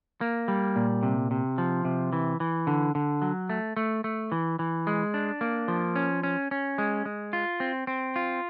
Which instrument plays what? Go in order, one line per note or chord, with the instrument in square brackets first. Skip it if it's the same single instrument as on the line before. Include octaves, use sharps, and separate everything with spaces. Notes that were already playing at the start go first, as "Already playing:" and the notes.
[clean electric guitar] A#3
G3
A#2
C3
C3
F3
C3
E3
E3
D3
D3
F#3
A3
A3
A3
E3
E3
G#3
D4
A#3
F3
C#4
C#4
C#4
G#3
G#3
F4
C4
C4
F4